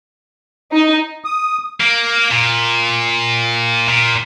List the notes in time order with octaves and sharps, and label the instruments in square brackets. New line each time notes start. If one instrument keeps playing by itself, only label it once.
[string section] D#4
[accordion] D#6
[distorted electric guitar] A#3
A#2
A#2